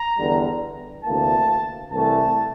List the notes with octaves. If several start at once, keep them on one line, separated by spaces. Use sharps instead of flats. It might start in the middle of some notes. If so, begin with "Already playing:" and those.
Already playing: A#5
E2 D3 G3
D2 C3 E3 A#3 A5
C2 C3 E3 A3 A5